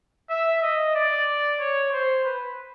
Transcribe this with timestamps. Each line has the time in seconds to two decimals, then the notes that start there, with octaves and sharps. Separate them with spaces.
0.30 E5
0.62 D#5
0.95 D5
1.60 C#5
1.92 C5
2.24 B4